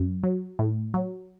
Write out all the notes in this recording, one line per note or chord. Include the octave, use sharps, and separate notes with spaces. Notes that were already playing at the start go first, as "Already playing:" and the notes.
Already playing: F#2
F#3
A2
F#3